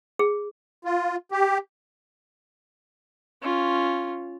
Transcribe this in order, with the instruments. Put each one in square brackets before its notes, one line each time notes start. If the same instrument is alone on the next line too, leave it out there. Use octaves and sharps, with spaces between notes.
[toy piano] G#4
[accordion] F4
G4
[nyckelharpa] C#4 F4